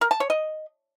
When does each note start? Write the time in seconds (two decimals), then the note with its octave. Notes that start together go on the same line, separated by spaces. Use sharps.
0.01 A#4
0.11 A5
0.20 C#5
0.30 D#5